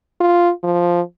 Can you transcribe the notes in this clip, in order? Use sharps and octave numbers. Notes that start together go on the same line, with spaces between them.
F4
F3